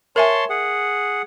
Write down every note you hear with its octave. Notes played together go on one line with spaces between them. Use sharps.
A#4 C#5 E5 G#5 A5 C6
G#4 F#5